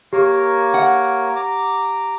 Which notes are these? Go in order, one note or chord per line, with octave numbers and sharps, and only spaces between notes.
A#3 G4 A#4 C#5
F#5
A#5 D6